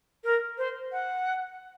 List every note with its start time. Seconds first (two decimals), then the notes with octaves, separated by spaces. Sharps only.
0.24 A#4
0.58 C5
0.92 F#5